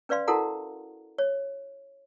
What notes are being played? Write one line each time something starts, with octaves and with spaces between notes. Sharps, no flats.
C#4 B4 D5 F5 C6
E4 F#4 A4 A#4 F#5 A#5
C#5